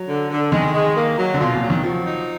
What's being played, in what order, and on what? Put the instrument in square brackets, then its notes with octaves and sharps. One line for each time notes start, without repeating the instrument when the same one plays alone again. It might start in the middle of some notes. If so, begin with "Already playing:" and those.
Already playing: [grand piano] F#3
[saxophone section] D3
D3
[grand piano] D#3 [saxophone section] G#3
[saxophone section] G#3
A#3
F#3
[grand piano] D3
[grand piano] B2 [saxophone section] F4
[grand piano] A#2
[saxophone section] F#3
[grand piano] D#3
[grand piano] F3 [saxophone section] F#3
[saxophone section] D#4